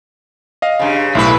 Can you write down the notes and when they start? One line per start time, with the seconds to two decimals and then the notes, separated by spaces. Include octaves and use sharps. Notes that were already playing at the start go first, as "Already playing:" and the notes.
0.62 D#5 F5
0.79 G2 C#3
1.15 B1 A2 E4 B4